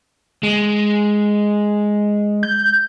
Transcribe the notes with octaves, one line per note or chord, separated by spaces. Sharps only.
G#3
G6